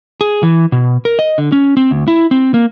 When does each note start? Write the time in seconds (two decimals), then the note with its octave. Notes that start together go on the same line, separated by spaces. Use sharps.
0.21 G#4
0.43 E3
0.72 B2
1.05 A#4
1.19 D#5
1.38 D3
1.52 C#4
1.77 C4
1.91 D2
2.08 E4
2.31 C4
2.54 A#3